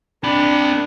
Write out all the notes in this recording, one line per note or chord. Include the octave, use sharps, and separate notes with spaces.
C4 D4 B5